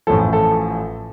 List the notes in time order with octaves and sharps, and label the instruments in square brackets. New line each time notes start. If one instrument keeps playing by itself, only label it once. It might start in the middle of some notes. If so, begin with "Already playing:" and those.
[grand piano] A1 A2 F3 A4
A4